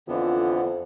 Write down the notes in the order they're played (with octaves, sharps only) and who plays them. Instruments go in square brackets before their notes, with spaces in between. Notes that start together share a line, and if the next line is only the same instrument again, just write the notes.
[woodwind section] F2 [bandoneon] D3 E3 B3